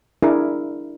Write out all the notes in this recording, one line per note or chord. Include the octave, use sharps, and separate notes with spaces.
D4 E4 G#4 A#4